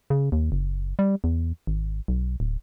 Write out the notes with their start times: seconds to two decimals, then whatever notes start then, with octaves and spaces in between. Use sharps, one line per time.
0.10 C#3
0.32 D#2
0.52 F#1
0.99 G3
1.24 E2
1.67 G#1
2.08 B1
2.40 D1